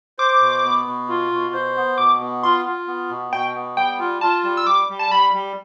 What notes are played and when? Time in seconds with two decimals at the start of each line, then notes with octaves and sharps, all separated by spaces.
0.19 C5 D6
0.41 B2
0.65 B3
0.86 B2
1.09 F4
1.32 B2
1.53 C5
1.76 B3
1.98 B2 D6
2.21 B3
2.43 F4 C6
2.65 F4
2.87 B3
3.10 B2
3.33 B2 G5
3.55 B3
3.77 G3 G5
3.99 F4
4.21 F4 A5
4.44 G3
4.57 E6
4.67 G3 D6
4.89 G3
4.99 A5
5.11 G3 B5
5.33 G3